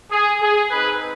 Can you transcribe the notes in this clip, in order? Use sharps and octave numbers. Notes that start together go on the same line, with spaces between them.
G#4
G#4
G#3 C4 D#4 B4